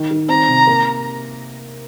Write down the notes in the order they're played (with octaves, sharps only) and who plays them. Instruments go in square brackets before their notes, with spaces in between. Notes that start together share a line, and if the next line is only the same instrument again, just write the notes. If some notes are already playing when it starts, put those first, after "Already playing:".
Already playing: [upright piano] D#3
D#3
[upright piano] C4 [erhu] A#5
[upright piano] C3
A#3